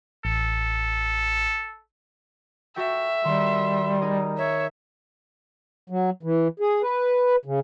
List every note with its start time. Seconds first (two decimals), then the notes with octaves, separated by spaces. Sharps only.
0.25 A1 A4
2.76 F#4 A4 E5 G5
3.25 D#3 G3 C6
4.01 D#4 G#4 A#4
4.38 C#5 E5
5.90 F#3
6.23 E3
6.60 G#4
6.82 B4
7.45 C#3